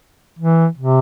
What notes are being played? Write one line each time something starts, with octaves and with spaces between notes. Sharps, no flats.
E3
C3